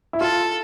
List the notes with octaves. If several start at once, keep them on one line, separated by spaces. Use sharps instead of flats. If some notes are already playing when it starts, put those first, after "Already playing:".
E4
F4 A4